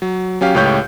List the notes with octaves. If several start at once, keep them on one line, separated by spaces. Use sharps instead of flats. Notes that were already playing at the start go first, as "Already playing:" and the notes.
F#3
F#3 C#4 G4 F5
C#2 A2 G4 C#5 G6